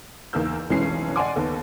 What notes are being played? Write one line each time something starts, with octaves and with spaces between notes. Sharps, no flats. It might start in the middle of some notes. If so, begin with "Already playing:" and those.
E2 A#3 D#4 A#4 E6 G6
F1 B1 E3 G#3 C#4 C7
D5 D#5 F#5 G#5 C6 D6
D#2 B3 A4